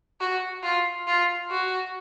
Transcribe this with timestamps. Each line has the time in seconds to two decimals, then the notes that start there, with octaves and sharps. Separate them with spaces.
0.20 F#4
0.63 F4
1.07 F4
1.51 F#4